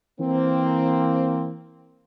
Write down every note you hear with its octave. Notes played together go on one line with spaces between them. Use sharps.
E3 A#3 C4